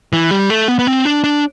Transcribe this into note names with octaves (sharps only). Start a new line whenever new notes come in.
E3
G3
A3
B3
B3
C4
D4
D4